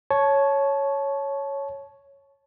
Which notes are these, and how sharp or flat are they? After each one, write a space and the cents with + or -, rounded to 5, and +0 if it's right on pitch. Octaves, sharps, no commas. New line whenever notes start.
C#5 +0 A5 -20